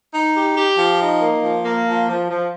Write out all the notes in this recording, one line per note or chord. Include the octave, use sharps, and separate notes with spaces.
D#4
G4
G4
F3
D#4
A#3
F3
A#3
F3
F3
F3